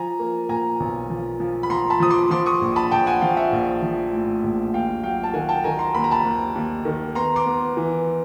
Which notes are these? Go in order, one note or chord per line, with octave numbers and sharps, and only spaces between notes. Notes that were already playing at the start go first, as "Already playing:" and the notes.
Already playing: F3 G#5 A#5
A#3
A#2 G#5 A#5
B1
F3
F3
B5
F3 A#5 C6
A5 B5
F3 D#6
C6 D6
F3 C6 D6
C#6 D#6
A#1
A5 B5
A#1 G5 A5
F#5 G#5
F3 F5 G5
E5 F#5
A#1
F3
A2
A#1
D#2 F5 G5
F#3 F5 G5
A5
D#3 F#5 G#5
G5 A5
D#3 G#5 A#5
A#5 C6
D#2 B5
A#5
A5 B5
D#2
D#2
D#3
B3 A#5 C6
C6 D6
B3
E3